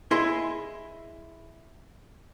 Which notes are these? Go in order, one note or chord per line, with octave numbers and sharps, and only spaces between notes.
E4 G#4 D#5 C6